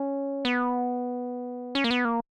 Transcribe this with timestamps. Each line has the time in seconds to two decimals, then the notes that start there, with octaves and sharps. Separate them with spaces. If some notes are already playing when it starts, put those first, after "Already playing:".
Already playing: C#4
0.45 B3
1.75 C#4
1.84 A#3
1.91 B3
2.05 A#3